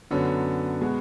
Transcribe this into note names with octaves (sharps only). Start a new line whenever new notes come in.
F#2 D3 F#3 B3
B2 G#3 B3 F#4